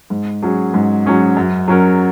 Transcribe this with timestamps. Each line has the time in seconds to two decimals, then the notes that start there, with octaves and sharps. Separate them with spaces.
0.10 G#2
0.43 F#3 C#4 G#4
0.74 G#2
1.06 F#3 C#4 G#4
1.37 F#2
1.68 F#3 C#4 A#4